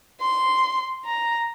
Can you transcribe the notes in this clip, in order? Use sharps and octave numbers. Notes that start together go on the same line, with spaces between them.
C6
A#5